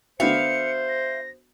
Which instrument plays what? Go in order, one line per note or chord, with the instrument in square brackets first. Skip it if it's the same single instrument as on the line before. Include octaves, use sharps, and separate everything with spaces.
[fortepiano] D3 B3 F#4 [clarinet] C5 [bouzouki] E5 F5 [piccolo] C#7
[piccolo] A#6